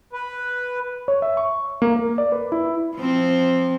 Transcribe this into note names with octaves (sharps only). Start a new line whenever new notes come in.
B4
C#5
E5
C#6
A#3
A#4
D5
B4
E4
F3 C4